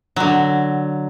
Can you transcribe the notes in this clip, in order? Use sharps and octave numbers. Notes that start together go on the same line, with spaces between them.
D3 F#3